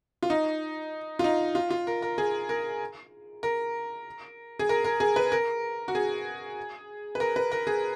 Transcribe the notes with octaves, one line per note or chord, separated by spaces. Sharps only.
F4
D#4
F4
D#4
F4
F4
A#4
A#4
G#4
A#4
A#4
G#4
A#4
A#4
G#4
B4
A#4
F#4
G#4
B4
A#4
B4
A#4
G#4